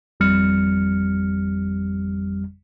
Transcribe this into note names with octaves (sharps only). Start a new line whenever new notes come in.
G#1 F2 G3 F6 C#7